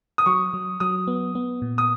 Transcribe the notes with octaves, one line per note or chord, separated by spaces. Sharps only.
D#6
F#3 C#6
F#3
F#3 D#6
B3
B3
A#2
D#6